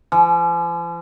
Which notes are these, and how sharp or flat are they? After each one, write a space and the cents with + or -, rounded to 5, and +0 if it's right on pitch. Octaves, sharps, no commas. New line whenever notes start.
F3 -45